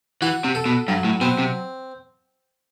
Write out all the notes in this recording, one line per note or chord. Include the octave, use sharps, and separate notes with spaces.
E3 F#4
C3
A4
B2
G2 F#3
A2
B2 C4
C3